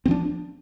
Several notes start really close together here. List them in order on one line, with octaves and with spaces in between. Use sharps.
C4 F3 D4